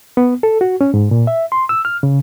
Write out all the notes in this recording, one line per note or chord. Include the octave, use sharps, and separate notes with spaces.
B3
A4
F#4
C#4
G#2
A#2
E5
C6
E6
F6
C#3